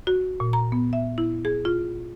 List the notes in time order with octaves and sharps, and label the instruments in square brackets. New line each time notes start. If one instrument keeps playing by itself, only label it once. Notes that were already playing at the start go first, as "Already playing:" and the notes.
[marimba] F#4
A#2
A#5
B3
E5
E4
G#4
F4